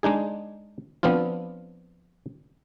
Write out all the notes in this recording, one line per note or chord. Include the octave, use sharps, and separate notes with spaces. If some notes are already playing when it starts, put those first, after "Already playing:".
G#3 D4 D#4 G#4
F3 B3 C4 D4 F4